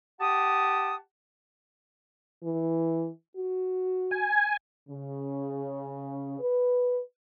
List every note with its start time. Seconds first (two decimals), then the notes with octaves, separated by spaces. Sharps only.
0.21 G4 F#5 A5 D#6
2.44 E3
3.37 F#4
4.11 G#5
4.89 C#3
6.40 B4